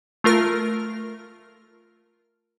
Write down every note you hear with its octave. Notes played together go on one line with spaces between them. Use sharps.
A3 F4 A#4 F6